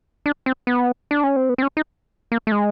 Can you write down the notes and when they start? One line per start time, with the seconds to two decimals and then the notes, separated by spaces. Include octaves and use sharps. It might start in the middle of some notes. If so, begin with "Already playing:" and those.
0.26 D4
0.46 C4
0.67 B3
1.11 D4
1.24 C#4
1.36 C4
1.49 B3
1.58 C4
1.63 C#4
1.77 D#4
2.32 A#3
2.47 A3
2.52 G#3